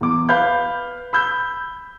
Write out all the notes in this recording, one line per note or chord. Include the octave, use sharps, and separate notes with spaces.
E2 D6
B4 F5 B5 G6
B5 E6 G6